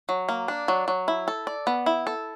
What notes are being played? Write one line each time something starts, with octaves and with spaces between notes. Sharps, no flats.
F#3
A#3
D4
F#3
F#3
E4
A4
D5
B3
E4
A4